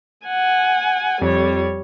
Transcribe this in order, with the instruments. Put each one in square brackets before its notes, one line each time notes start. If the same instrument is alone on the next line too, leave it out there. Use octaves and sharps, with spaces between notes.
[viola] F#5 G#5
[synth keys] F2 [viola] G3 C#5